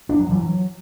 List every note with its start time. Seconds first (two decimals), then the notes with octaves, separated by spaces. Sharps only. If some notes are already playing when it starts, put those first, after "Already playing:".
0.09 D4
0.19 F#3
0.29 E3
0.39 F#3